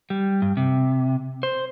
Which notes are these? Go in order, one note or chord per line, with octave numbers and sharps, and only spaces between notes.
G3
G2
C3
C5